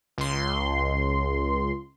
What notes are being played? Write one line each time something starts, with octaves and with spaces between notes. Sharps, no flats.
C#2 C6